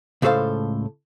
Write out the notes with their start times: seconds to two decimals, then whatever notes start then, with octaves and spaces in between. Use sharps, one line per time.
0.22 C#2 A2 G#4 A4 C5 F5